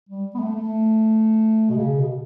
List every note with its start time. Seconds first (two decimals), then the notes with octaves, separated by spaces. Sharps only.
0.09 G3
0.35 B3
0.40 A3
0.55 A3
1.69 B2
1.78 C#3
1.99 B2